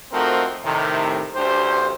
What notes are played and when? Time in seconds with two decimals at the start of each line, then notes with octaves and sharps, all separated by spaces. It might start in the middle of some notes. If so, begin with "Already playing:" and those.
0.12 F3 A3 C4 D#4 F#4 A#4
0.63 A2 C3 D#3
1.35 A1 D2 D3 G4 C5